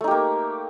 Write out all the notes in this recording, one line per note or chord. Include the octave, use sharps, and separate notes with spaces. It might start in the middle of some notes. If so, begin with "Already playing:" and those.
A3 A#3 D#4 G4